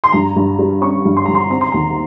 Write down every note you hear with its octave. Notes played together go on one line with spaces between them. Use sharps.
C6
G2 A#5
G2
G3
C#4 C#6
G2
C6
G2 A#5
C6
C4 A#5
C6
D#2 A#5